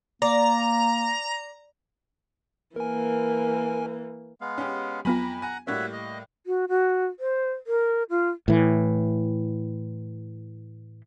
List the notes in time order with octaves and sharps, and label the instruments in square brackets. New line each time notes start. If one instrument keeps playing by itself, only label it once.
[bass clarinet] A#3 [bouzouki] D5 [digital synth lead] A#5
[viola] E3 A#3 [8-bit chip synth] A#4 G#5
[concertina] G#3 B3 F5
[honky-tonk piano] C#4 G4
[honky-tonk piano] F2 G#5 B5 [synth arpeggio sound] F#3 B3 F4 [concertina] A#5
[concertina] F#5 A#5 [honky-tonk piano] G#5
[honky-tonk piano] A2 G3 A#3 [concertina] F#4 C#5 E5
[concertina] D#5
[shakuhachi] F#4
F#4
C5
A#4
F4
[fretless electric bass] A2 E3